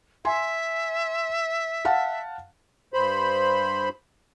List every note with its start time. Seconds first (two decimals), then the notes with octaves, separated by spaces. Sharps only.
0.25 E5 G#5 C6
1.85 F5 F#5 A5
2.94 G2 C5 B5